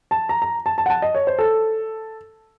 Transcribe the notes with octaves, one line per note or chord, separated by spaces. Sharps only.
A5
A#5
A#5
A5
A5
F#5
A5
D#5
C#5
C5
A4